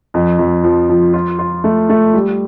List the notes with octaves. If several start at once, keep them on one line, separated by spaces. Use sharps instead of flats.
F2
F2
F3
F3
F4
F4
A3
A3
G3